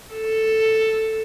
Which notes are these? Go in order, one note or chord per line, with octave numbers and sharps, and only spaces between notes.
A4